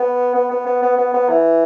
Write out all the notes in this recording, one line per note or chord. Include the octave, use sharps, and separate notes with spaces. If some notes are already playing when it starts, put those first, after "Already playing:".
Already playing: B3
B3
B3
B3
B3
B3
B3
E3